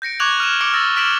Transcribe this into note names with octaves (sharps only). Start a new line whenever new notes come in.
G6 A#6 C#7 D7
C#6 D6 F#6 G#6 F7 F#7
F6 D#7 E7
D6 F6 C#7 D7 F#7 G7
E6 F6 A6 A#6
F6 B6 D7 E7 F#7